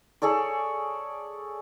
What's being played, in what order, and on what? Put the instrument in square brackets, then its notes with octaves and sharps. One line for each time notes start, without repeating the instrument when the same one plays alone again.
[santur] G#4 A4 C#5 D5